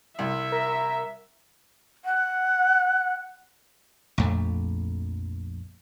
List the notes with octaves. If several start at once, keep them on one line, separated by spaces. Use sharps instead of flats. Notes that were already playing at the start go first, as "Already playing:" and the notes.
C2 E5
A#4
F#5
A#1 F2 A3